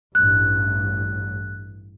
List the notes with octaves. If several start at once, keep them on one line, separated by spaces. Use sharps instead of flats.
A1 G2 F#6